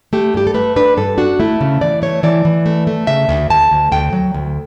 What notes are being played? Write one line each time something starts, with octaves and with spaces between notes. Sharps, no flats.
A3 G4
G2 G4
A4
A3 B4
D4 B4
G2 A4
D4 F#4
A3 E4
C#3
E3 D5
A3 C#5
E3 D5
E3
A3
A3
C#3 E5
D2
D2 A5
D2
D2 G5
F#3
D2